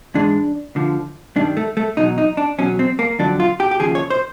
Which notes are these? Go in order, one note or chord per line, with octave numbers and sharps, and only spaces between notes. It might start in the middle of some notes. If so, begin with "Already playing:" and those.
G#2 E3 G#3 D4
D2 D3 F3
G2 D#3 G3 D4
A3
A3
E2 B2 F#3 D#4
D#4
D4
E2 B2 F#3 C#4
C4
A#3
F2 D3 F#3 D4
F4
G4
G4
D#2 C#3 F3 G#4
C#5
C5